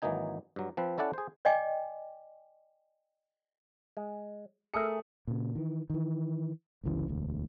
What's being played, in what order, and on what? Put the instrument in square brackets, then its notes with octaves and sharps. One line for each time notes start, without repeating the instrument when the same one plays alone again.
[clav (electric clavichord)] G#1 E3 F#3 A#3 D#4 G#5
G2 F#3
F3 C4 B4
C#4 E4 A4 D5 F#5 A5
G#4 C5
[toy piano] D5 D#5 G5 G#5 D6
[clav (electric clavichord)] G#3
[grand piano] A3 D#6 C#7 [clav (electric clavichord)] G#4 A#4 E5
[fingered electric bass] A#2 C#3
D#3 E3
D#3 E3
G1 C#2 C#3 E3
E1 D2